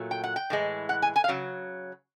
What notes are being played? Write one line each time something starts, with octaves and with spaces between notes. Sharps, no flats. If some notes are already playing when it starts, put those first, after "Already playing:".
Already playing: A#2 F#3 A3
G5
F#5
G5
A2 E3 G#3
F#5
G#5
G#5
F5
C#3 F#3